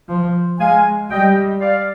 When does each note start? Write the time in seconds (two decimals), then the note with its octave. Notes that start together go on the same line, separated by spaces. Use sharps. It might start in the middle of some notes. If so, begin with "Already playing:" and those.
0.08 F3
0.59 G#3 F5 G#5
1.10 G3 D#5 G5
1.61 D5 F5